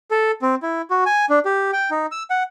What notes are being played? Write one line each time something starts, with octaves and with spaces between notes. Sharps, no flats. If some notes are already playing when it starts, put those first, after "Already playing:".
A4
C4
E4
F#4
G#5
D4
G4
G5
D#4
E6
F#5